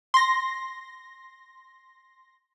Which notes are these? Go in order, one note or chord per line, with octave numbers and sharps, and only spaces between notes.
C6 A#6